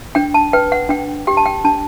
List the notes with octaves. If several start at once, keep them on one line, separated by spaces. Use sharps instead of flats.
D4 G5
A5
B4 G5
F#5
D4 G5
G4 G5
A5
G5
D4 A5